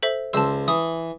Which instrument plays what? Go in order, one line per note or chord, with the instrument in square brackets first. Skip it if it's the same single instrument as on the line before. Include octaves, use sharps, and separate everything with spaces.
[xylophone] A4 C5 E5
[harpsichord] C#2 C5 [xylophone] A5 E6
[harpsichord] E3 [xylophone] D#6